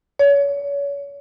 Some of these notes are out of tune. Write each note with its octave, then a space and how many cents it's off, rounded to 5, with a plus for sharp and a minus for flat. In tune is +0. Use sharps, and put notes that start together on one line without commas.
C#5 +35